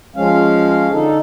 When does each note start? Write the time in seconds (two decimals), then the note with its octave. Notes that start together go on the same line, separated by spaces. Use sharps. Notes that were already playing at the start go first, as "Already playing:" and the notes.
0.16 F3 G#3 C#4 F5
0.92 D3 D#4 A4